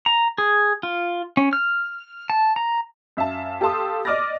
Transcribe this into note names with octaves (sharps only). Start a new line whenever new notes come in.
A#5
G#4
F4
C#4
F6
A5
A#5
F#2 E5 F5 A5
G4 A4 F5 A5 C6 D#6
D5 D#5 D6 F6 A6 A#6